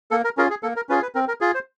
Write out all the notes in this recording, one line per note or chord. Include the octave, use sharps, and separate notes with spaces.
A#3 A4
A#4
C#4 F4 G#4 A#4
G#4
A#3 A4
A#4
C#4 F4 G#4 B4
B4
C4 A#4
A#4
F4 G#4
C5